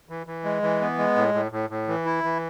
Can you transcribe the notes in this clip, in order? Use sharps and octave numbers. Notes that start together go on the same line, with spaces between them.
E3
E3
G#3
E3
B3
G#3
A2
A2
A2
A2
E3
E4
E3